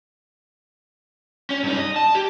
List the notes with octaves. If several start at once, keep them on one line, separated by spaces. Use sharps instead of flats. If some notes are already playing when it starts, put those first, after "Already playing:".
C#4
G2 D#4
D#5
A5
G4